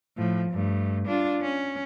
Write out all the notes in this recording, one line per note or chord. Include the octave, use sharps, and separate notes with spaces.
A2 F3
G2 A3
D4 F4
C#4